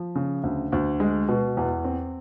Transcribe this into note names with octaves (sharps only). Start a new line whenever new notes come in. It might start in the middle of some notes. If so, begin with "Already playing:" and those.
Already playing: F3
C#3
D2
D2
G#3
B2
E2
C4